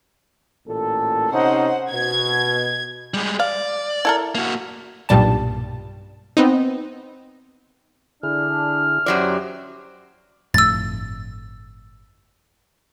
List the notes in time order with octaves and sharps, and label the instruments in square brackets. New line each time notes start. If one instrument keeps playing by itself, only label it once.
[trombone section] A1 A#2 A4
[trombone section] C3 C#4 D#4 [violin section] C5 F#5
[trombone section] B2 [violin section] G#6
[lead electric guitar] G3 G#3
[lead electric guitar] D5 [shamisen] F5
[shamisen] E4 A4 A#4
[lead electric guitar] A#3 F#4
[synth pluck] B1 G2 A#2 G3 A5
B3 C4 D#4
[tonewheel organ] D3 E4 G#4 [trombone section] D4 [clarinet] F6
[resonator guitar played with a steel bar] F#2 F#3 D5 [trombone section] E4 G4 C5
[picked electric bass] G1 F2 A2 [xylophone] E6 A6